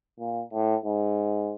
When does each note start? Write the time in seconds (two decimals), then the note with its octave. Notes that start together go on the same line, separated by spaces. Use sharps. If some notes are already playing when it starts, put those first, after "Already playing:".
0.19 A#2
0.53 A2
0.85 G#2